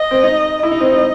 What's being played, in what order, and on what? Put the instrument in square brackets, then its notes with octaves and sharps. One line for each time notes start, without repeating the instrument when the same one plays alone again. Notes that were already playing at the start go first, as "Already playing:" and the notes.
Already playing: [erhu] D#5
[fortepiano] C4
D#4
[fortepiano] E4 [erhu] D#5
[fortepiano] D#4
C4
D#4